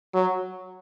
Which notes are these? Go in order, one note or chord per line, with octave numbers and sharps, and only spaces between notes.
F#3